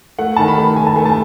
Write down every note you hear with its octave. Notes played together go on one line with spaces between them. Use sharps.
A3 F#5
D#3 A5
B5
A3
D#3 G#5
A5
A3 G#5
A5